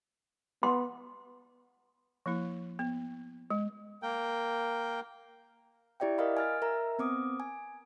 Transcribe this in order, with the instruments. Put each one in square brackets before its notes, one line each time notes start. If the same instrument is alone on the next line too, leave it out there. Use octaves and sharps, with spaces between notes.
[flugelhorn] B3 [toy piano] C6
[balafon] F3 A#3 E4
B3
G#3
[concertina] A#3 A#4 G5
[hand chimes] E4 G4 D5 E5 G5
A#4 D#5 F5 B5
G#5 F6 A6
A#4 E5 A#5
B3 C4 D6 D#6
G#5